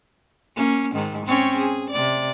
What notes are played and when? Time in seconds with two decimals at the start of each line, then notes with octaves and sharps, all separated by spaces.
0.56 A#3 C#4
0.95 G#2 D#3
1.26 C4 C#4 C#5
1.57 G#4
1.90 C3 D5